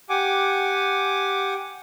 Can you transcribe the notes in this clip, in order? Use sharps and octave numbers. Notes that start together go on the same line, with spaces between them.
G4 F#5 G#5 D6